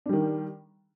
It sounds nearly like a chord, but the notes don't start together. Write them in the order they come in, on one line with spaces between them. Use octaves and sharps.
D4 G3 D#3